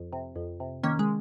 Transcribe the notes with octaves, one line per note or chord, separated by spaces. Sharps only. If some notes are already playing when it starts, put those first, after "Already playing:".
Already playing: F2
C3
F2
C3
D#3 A#3 C#4
G#3